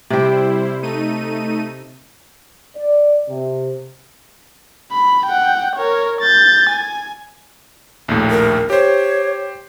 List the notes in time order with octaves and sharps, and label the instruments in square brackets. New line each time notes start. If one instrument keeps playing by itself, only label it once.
[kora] C3 G4 [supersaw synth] G3 E4 C5
[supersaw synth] A3 D#4 D#7
[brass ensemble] D5
C3
[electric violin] B5
F#5 G5
A#4 C#5
G6 A6
G#5
[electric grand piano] A#1 D#2 A2
[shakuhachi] A#4
[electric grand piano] G4 C5 [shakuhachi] C#5